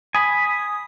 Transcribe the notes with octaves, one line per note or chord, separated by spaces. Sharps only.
G#5 B5 D#6